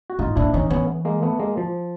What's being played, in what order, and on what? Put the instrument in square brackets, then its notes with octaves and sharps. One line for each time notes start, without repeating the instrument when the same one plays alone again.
[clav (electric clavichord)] F#4
[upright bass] G#2 [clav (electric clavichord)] D#4 F4
[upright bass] A#2 [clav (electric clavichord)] D4 E4
[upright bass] E3 [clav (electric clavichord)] C#4 D#4
[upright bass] E3 [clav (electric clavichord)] B3 C#4
[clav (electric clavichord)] G#3 A#3
A3 B3
G#3 A#3
F3